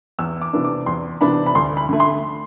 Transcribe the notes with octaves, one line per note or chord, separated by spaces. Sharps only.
E2 E6
D6
C3 E3 B3 D4
D6
E2 C6
C3 E3 B3 D4 B5
B5
D2 C6
B5
D3 A3
C6